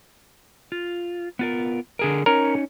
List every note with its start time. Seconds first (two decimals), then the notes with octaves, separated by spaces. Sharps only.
0.72 F4
1.39 B3 F4 A#4
1.99 D3 G#4 A#4
2.26 C#4 D#4 A#4 C#5